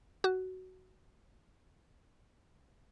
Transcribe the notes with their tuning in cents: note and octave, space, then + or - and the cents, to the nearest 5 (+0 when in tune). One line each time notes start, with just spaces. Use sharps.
F#4 +10